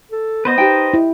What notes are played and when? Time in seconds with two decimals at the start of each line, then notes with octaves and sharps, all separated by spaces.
0.11 A4
0.45 B3 B4 C5 D#5
0.58 D#4 G4 G5
0.94 E4